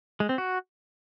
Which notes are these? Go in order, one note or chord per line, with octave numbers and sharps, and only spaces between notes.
G#3
C4
F#4